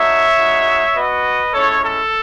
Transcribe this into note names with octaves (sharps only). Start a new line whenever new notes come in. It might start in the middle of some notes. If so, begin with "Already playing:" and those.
Already playing: A3 D#4 F#4 C#5 E5
G#3 D#4 F#4
B3 F#4 B4 D#5
G#3 C#4 E4 A4 C#5
A4